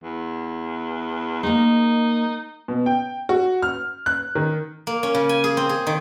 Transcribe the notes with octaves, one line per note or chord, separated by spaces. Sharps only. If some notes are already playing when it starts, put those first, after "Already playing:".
E2
G#3 A#3 D#4
B2
G5
F#4
F6
F#6
D#3
A#3
C#4
C#3
G#5
G#4
C4
G#4
D#3